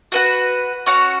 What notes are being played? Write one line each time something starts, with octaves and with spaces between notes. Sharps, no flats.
F#4 B4 F#5
C#4 F#4 C#5 F#5